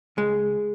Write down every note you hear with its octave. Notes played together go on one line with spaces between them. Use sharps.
C#2 G#3